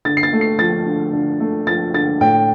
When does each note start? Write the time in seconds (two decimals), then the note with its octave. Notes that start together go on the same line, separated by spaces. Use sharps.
0.05 D3 A6
0.17 C7
0.23 A6
0.33 A3
0.41 C7
0.59 F3 A6
0.86 D3
1.13 D3
1.40 A3
1.67 F3 A6
1.94 D3 A6
2.21 A2 G5